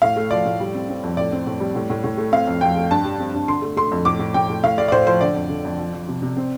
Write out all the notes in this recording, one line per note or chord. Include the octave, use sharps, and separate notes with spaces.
A2 F5
A3
F3 D5
A2
G3
C4
C4
F2
A2 D5
C4
A2
G3
A2
A2
A2
A3
C4 F5
F2
F2 G5
A3
G2 A5
G3
C4
G2
D3 C6
A3
A3 C6
F2
A2 D6
A2
A2 G5
A2
A2 F5
A3 D5
D5
A2 C5
F3 C5
D3 D5
F2
D3
F2
F3
F3
C3
C3
C4